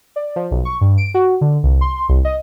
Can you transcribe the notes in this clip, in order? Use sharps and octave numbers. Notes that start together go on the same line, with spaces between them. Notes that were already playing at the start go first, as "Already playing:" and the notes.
D5
F3
B1
C#6
G2
D7
F#4
D3
C2
C6
C2
D#5